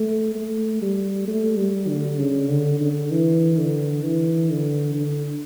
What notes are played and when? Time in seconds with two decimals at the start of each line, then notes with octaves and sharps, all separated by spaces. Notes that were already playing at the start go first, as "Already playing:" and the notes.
Already playing: A3
0.35 A3
0.82 G3
1.28 A3
1.57 G3
1.89 D3
2.19 C#3
2.49 D3
2.81 D3
3.11 E3
3.58 D3
4.04 E3
4.50 D3
4.95 D3